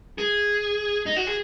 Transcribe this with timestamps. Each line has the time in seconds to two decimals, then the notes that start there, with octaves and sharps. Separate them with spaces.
0.18 G#4
1.06 D#4
1.16 F#4
1.27 G#4